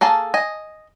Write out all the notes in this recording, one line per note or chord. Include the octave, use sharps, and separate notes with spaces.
A#3 G#4 A4 A5
D#5 G#5